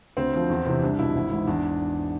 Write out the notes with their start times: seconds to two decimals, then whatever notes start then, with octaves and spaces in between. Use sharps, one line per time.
0.17 D2 C4
0.33 D3 F3
0.50 E2
0.66 C3 E3
0.82 C2 D4
0.99 B2 E4
1.15 G#1
1.32 G#2 E3
1.47 E2 D4